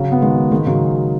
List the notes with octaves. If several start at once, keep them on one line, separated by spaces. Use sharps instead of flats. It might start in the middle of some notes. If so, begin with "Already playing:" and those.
Already playing: C#3 F#3
B3
D#3 G#3
D#3 G#3
C#3 F#3